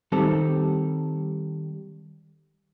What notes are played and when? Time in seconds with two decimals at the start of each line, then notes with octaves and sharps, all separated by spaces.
0.12 D#3 G3 C4 A4